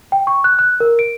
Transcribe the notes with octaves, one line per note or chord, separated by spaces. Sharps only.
G5
C#6
F#6
F#6
A#4
D7